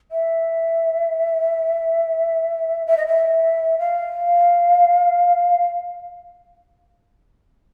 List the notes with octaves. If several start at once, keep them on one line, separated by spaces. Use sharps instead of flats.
E5
E5
D#5
E5
F5